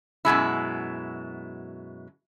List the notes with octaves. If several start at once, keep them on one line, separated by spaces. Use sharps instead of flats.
F#2 B2 G#3 E4